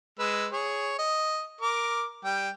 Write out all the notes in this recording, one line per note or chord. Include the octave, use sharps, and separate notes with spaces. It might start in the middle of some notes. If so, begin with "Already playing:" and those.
G#3 B4 E6
G#4 C#5
D#5
A#4 D6
G3 G5